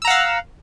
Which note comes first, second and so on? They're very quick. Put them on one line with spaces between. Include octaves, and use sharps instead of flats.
E6 A#5 F#5 F5